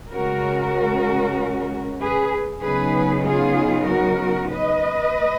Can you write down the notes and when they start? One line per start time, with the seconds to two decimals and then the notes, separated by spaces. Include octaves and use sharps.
0.12 C#3 G#3 C#4 F#4 A#4
2.00 G#4 B4
2.62 C#3 F#3 B3 D#4 G#4 B4
3.25 F4 G#4
3.88 F#4 A#4
4.51 B4 D#5